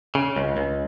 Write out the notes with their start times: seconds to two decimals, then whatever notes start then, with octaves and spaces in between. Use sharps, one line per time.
0.15 C#3
0.36 C#2
0.57 C#2